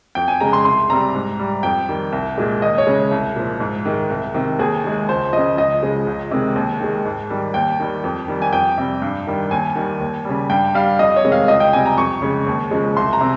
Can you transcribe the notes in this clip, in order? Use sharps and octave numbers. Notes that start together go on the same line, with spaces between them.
F2 G5
G#5
C#3 G#3 A#5
C6
C2 C6
C3 G3 A#5
G#2
G3
F2 G5
D#3 G3
C2
A#2 G#3
D#2 D#5
C#5
C#3 G#3
C2
A#2 F3
G#2
D#3 G#3
C2
C3 D#3
D#2 G#4
D#3 G#3
C#2 C5
C#3 F3 D#5
C#2 D#5
C#3 F3 G#3
C#2
C3 D#3 G#3
D#2
D#3 G#3
G#2
D#3 G3
D#2 G5
D#3 G3
F2
D#3 G3
G#5
F2 G5
C3 G3
G2
D#3 G3
D#2 G#5
D#3 G3
D#2
C#3 G3
G2 G5
G3 F5
F2 D#5
C#5
C3 D#3 G#3
F5
C#2 D#5
G5
C3 G3 G#5
A#5
F2 C#6
C#3 G#3
D#2
C#3 F3 G#3
C2 C6
A#5
C3